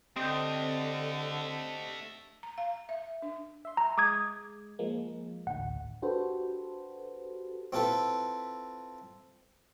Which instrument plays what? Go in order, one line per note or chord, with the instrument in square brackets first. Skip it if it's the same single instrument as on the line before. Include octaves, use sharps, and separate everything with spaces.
[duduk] D3 [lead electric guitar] A3 D4 [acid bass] C4 [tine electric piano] G4 C5 D#5
[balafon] A#5
F5
E5
D4
[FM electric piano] E5 C6
[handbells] A#5
[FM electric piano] G#3 [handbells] D6 D#6 G#6
[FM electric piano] F3 G#3 A#3
[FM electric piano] A1 D2 [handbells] F#5
[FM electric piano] D4 F#4 G4 A4 B4 C5
[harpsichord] C4 E4 F4 A4 B4